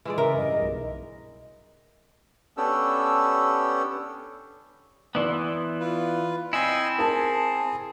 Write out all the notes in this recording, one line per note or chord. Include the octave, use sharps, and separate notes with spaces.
E3 G#3 D5
C#3 A#4 E5
G2 D#5
B1
B3 C#4 D4 G4 A4 E6
E3 B3 D5 C6
F4 B4
C4 E4 D#5 G#5 E6
G#4 A#4 A5 D#6